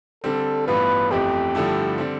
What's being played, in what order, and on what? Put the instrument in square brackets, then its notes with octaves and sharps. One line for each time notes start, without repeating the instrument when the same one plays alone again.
[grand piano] D3 G3 C4 [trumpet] A4
[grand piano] A1 G2 E3 B3 F4 [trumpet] B4
[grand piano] G1 F2 E3 A3 C4 [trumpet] G4
[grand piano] G2 D3 F3 A3 E4
D3 G3 C4